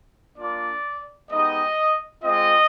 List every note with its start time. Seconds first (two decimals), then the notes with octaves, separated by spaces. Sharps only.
0.38 A#3 D4 F4 D5
1.30 G#3 B3 D#4 G4 D#5
2.23 G#3 C4 F4 D#5